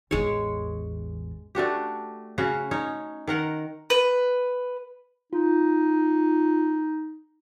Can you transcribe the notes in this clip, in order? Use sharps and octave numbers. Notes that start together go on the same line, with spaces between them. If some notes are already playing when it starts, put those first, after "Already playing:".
A1 E2 G#3 C#5
A3 D4 F#4 G4
C#3 C#4 F#4 F#5
C#4 D#4 C#5
D#3 A#4 F#5
B4
D#4 F4